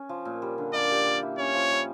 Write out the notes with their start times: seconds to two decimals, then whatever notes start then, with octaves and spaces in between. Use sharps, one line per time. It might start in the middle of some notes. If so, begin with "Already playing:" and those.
Already playing: C#4
0.09 F3
0.25 A#2
0.42 G3
0.58 D3
0.74 A#3 D5
0.91 G4
1.07 G3
1.22 E4
1.38 C#4 C#5
1.54 F3
1.71 G3